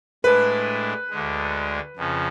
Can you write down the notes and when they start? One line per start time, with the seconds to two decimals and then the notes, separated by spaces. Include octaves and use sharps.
0.24 A2 G#3 D4 B4
1.10 D2 D3 G#3
1.97 F2 C#3 F3